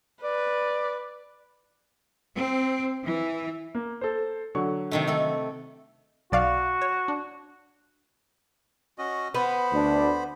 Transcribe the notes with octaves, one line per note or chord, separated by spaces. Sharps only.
B4 D5
C4
E3
A#3
A4 C5
D3 F#3 C#6
C3 D#3 A3
A3 A4
B1 F#4 D5 F5
C#5
D4
C#4 F#4 D#5
B3 C5 B5
D2 D4